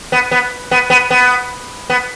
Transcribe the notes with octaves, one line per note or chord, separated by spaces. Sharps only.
B3
B3
B3
B3
B3
B3